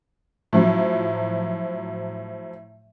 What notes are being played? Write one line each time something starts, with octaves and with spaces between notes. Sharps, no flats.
A2 F3 F#3